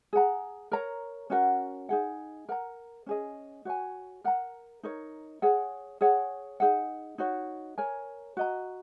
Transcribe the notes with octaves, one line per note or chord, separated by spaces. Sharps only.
G#4 F#5 A#5
A#4 C#5 A#5
C#4 F#4 A#4 F#5
D#4 G#4 F#5
A#4 F#5 A#5
C#4 G#4 D#5
F#4 C#5 G#5
A#4 F#5 A#5
D#4 A#4 C#5
G#4 C#5 F#5
G#4 C#5 F#5
D#4 G#4 F#5
D#4 F#4 C#5
A#4 C#5 G#5
F#4 D#5 A#5